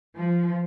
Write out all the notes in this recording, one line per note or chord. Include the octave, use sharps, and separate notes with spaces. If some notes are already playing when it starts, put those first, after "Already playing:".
F3